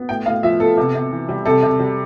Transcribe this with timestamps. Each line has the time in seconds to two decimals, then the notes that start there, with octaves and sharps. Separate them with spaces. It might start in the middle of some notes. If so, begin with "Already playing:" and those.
Already playing: B3
0.09 A2 G5
0.26 A2 F5
0.43 F3 E5
0.60 B3 A4
0.77 C3
0.95 C3
1.11 E3
1.29 G3
1.45 C3 A4
1.63 C3
1.79 G3